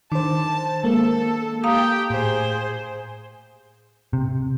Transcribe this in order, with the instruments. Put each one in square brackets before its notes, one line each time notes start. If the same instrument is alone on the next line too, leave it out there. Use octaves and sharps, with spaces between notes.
[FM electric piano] D#3 C5 [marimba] D4 [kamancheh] A5
[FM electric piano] G#3 A#3 [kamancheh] A4 A5
[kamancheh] G4 G5 [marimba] F5 A#5 D#6
[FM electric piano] A2 [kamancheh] G#4 C5
[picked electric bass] C3